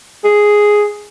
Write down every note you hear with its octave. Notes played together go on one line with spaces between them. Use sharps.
G#4